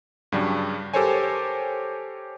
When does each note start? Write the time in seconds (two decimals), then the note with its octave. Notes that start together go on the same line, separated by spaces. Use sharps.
0.32 G2 C#3 F#3 G3 D4
0.94 G4 A4 A#4 C5 C#5 G#5